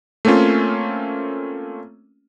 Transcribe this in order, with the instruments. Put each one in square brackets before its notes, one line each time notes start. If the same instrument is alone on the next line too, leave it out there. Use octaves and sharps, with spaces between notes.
[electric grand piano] A3 A#3 C4 C#4 F4